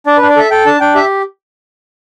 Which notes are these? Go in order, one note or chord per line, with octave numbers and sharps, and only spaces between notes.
D4 D5
D4 B4
D5
A4 E5
A4 G5
D4 A5
D4 G5
G4 E5